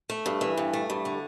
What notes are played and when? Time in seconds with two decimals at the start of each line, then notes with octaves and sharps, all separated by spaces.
0.10 A3
0.26 G2
0.41 E3
0.57 G2
0.73 A3
0.90 G2
1.05 D3